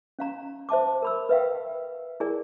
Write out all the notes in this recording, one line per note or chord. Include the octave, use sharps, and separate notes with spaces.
C#4 F5 A#5
C5 E5 A5 D6
A#4 B5 E6
B4 E5 F5 G5
E4 G#4 A#4 D5 G#5